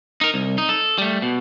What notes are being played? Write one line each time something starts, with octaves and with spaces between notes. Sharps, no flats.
D#4 A#4
C2
D#4
A4
G3 A3
B2